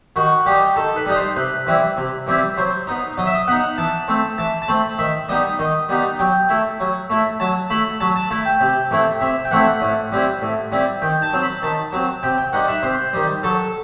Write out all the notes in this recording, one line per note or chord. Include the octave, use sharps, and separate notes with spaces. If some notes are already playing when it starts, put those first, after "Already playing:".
D#3 F#4
G3 D#4 G4
D#3 A4
B4
G3 D#4 D#5
C5
C3 B4
E3 G3 C4 E4
C3
E3 G3 C4 E4
F#3 C5
B3 D#4
F#3 D#5
E5
D#5
B3 D#4 F#5
E3 A5
A3 C4
E3 A5
A5
A3 C4 B5
D#3 E5
G3 B3 D#4 D#5
D#3 D#5
G3 B3 D#4
F#3 G5
A3 E4
F#3
A3 E4
F#3 A5
A3 E4 B5
F#3 A5
A5
A3 E4 A5
G5
C3
E3 A3 C4 E4
C3 E5
G5
E3 A3 C4 E4 F#5
A2
G3 C4 E4
A2
G3 C4 E4
D#3 G5
A5
F#3 C4
B5
D#3 A5
F#3 C4
C3 G5
G5
D#3 G3 F#5
E5
C3 C5
D#3 G3
F#3 A4